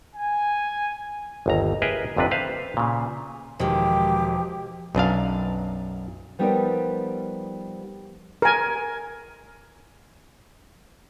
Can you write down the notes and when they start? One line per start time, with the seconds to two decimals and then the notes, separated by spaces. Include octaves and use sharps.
0.16 G#5
1.46 G1 D#2 A#5
1.82 G#4 A#4 B4 D#5 E5
2.16 G1 F2 C3 D4 B4
2.31 B4 C5 E5 F5
2.77 A#2 C#3
3.60 E1 D#3 F3 G#3 G4
4.95 B1 F#2 D4 F5
6.39 F3 G3 B3 D#4 A#4 D5
8.42 A#4 G#5